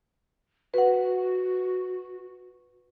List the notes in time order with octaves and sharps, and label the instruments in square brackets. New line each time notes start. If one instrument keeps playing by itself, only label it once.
[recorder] F#4 [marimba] B4 F#5